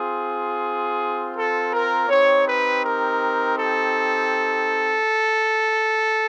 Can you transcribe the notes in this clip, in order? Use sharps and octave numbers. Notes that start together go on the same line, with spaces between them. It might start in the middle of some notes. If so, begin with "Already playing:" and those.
Already playing: C4 F4 G#4
A4
A#4
C4 D#4 G4 C#5
B4
A#4
A4